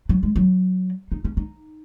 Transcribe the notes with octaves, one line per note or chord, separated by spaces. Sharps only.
F#3
G#3
F#3
D#4
C#4
D#4